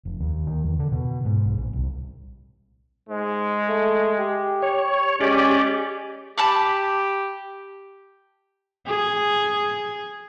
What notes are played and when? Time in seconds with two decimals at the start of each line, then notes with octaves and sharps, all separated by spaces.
0.05 F1
0.20 D#2
0.47 D#3
0.64 E2
0.79 D3
0.92 B2
1.25 G#2
1.46 B1
1.58 A#1
1.73 C2
3.09 G#2 G#3
3.68 A3
4.18 G4
4.62 C#5
5.21 G#3 C#4 G4 D5
6.38 G4 A5 B5 D6
8.87 G#4